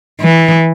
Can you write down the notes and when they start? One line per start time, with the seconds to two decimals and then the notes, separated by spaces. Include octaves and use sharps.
0.21 E3